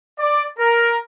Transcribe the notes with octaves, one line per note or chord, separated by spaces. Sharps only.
D5
A#4